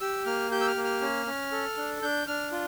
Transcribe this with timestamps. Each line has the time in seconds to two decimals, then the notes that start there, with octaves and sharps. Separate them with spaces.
0.01 G4 E6
0.26 A#3 F6
0.51 G4 G6
0.61 E6
0.67 F6
0.76 A#3
0.84 F6
1.01 C#4
1.26 C#4
1.52 A4
1.77 D4
2.02 D4 G6
2.27 D4 F6
2.52 F4